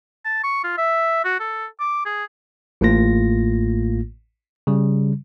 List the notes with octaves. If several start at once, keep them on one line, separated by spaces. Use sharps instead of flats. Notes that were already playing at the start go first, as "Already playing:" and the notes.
A5
C#6
F4
E5
F#4
A4
D6
G#4
A1 A2 A3 A#3 F4 A#6
C#3 G3